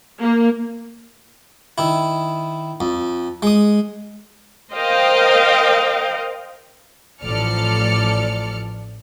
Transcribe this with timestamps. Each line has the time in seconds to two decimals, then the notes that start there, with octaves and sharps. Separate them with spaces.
0.20 A#3
1.78 D#3 E4
2.81 F2
3.42 G#3 D#6
4.74 A#4 C5 D#5 F5 G5
7.22 A1 F3 A4 D5 F6 C#7